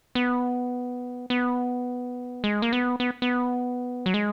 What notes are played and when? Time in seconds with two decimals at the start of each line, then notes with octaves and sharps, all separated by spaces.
0.15 B3
1.30 B3
2.44 G#3
2.62 A#3
2.73 B3
3.00 B3
3.22 B3
4.06 F#3
4.14 G#3